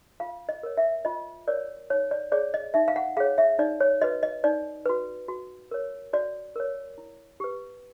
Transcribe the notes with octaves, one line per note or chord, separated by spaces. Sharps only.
F4 F5
D#5
A#4 C#5
E5
F4 D#5
A#4 C#5 D5
D#4 C#5
D5
G#4 C#5 D5
D#5
D#4 E5
F5
F#5
G#4 C#5 F5
E5
D#4 D5
C#5
F#4 B4 D#5
D#5
D#4 D5
F#4 B4
F#4
A#4 C#5
F#4 D5
A#4 C#5
E4
G4 B4